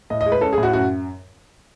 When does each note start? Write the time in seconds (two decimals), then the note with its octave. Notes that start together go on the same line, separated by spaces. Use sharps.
0.10 A2 D#5
0.21 D#5
0.26 G#3
0.32 B4
0.41 C#4 A4
0.53 G#4
0.58 A2
0.63 F#4
0.73 F#2 F#4